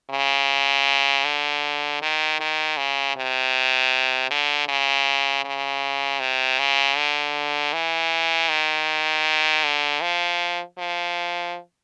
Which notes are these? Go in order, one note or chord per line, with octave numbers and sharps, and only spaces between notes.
C#3
D3
D#3
D#3
C#3
C3
D3
C#3
C#3
C3
C#3
D3
E3
D#3
D3
F3
F3